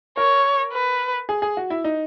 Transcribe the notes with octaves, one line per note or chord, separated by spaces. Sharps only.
A#4 C#5
B4
G#4
G#4
F#4
E4
D#4